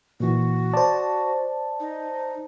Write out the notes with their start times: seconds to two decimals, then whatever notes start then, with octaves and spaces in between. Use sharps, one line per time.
0.20 A#2 E3 F#4
0.74 C5 D5 A5
1.80 D#4